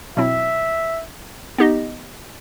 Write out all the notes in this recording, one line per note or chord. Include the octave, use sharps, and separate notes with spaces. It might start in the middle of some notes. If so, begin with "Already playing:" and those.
B2 F#3 C4 E4 E5
B3 D#4 G4 D#5